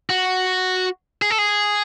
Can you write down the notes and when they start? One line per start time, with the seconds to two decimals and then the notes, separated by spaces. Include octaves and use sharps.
0.10 F#4
1.22 G#4
1.30 A4
1.38 G#4